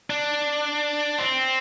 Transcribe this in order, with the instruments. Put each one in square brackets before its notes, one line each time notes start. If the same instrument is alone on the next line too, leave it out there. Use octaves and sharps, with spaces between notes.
[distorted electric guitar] D4
C4